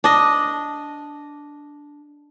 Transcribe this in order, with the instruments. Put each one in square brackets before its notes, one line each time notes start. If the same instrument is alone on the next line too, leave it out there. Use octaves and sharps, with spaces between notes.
[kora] D4 D#5